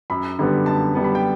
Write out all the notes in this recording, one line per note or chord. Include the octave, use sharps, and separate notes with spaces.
F#2 B5
D3 G3 B3
F#2 A5
D3 G3 B3
B5
G5